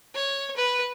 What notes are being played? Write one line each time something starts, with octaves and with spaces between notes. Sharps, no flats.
C#5
B4